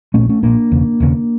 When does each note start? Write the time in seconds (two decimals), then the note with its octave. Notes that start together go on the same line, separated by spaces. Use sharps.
0.14 A#1 A#2 A3 C#4
0.29 A3 C#4
0.43 A#1 A#2 A#3 D4
0.72 E1 E2 C#3
1.00 E1 E2 C#3